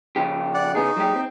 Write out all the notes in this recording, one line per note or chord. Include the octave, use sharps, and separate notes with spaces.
C#3 F3 G4
D5 F#5
C#3 B3 D#4 G#4
F#3 G#3 G4
C4